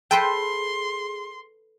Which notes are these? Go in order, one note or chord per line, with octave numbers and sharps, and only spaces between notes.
G#4 A4 B4 C5 G5 C6